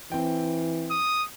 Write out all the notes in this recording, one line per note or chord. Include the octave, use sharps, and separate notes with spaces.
E3 C4 G5
D#6